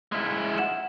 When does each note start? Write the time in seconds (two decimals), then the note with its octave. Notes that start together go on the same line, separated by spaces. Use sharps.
0.12 G#3 E4
0.58 F#5 E7